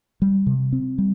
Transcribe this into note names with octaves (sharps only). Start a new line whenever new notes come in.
G3
C3
C4
G3